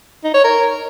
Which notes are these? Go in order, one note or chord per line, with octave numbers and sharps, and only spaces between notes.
D#4
C#5
A#4